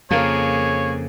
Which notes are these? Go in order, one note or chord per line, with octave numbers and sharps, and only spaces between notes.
F2 C#3 F3 A#3 G#4 A#4 C#5 F5